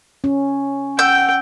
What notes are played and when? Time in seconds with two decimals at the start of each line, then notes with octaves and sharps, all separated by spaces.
0.24 C#4
0.99 F#5 G5 E6 G6